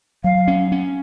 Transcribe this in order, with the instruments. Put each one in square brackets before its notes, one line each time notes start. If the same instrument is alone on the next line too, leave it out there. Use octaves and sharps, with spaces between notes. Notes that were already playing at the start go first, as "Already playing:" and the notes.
[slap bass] F#3 [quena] F5
[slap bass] C#4
C#4